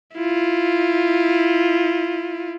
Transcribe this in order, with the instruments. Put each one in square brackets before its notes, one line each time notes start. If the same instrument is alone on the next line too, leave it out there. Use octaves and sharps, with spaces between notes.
[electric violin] E4 F4